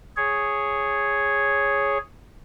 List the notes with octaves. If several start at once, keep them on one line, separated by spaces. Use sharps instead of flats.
G#4 C#5